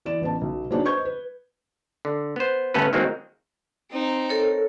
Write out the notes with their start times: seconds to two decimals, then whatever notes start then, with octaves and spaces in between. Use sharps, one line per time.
0.05 E3 D5 E7
0.21 A1 B3 A5
0.41 B1
0.71 F#3 A#3 D4 D#4 G#4 C#5
0.84 B4 C5 D#5 C#6 G6 G#6
1.05 B4
2.05 D3
2.36 B3 C5
2.74 G1 A3 B3 C#4 A4 B4
2.93 D#3 F#3 G#3 A#3 C4
3.91 C4 D#4
4.29 A4 A#4 C#5